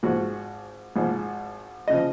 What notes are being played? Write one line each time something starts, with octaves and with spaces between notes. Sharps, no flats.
G#1 G#2 F3 F#4
G#1 G#2 F3
C#3 F3 D#5